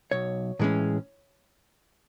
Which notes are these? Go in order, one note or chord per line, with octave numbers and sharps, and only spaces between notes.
B1 C#5
A2 E3 G#3 C#4